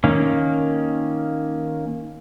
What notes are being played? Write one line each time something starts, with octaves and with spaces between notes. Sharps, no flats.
D#3 A#3 C#4